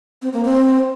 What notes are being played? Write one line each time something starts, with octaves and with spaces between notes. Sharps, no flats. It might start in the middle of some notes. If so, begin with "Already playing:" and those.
C4
A#3
C4